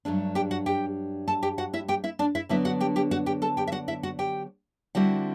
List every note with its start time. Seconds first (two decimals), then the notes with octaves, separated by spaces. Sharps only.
0.05 G2 F#3 A3 D4
0.35 G4 G5
0.51 F#4 F#5
0.66 G4 G5
1.28 A4 A5
1.43 G4 G5
1.58 F#4 F#5
1.73 E4 E5
1.88 G4 G5
2.04 E4 E5
2.19 D4 D5
2.35 E4 E5
2.49 D3 F#3 B3 D4 E4 E5
2.65 F#4 F#5
2.81 G4 G5
2.96 G4 G5
3.11 F#4 F#5
3.26 G4 G5
3.42 A4 A5
3.57 G4 G5
3.67 E5
3.72 F#4 F#5
3.88 E4 E5
4.03 F#4 F#5
4.19 G4 G5
4.95 D3 G3 C4 E4 F#4 F#5